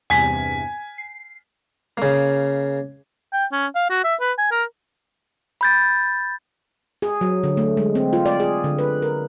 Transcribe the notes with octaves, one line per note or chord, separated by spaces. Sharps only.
E2 G2 C3 G#5 B6
C7
C#3 A#3
G5
C#4
F5
F#4
E5
B4
G#5
A#4
B5 G6 A6
G#4
F#3
D3
A3
G#3
C4
F4
D5
G#4
D3
B4
A#4